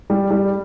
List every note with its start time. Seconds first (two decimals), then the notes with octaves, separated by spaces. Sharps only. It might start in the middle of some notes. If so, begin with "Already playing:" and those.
0.10 G3
0.31 G3